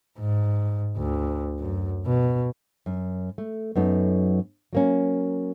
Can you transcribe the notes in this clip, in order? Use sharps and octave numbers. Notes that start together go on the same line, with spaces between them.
G#2
D2
F#2
B2
F#2
A3
F#2 F#3 B3 D#4 A4
F#3 A#3 C#4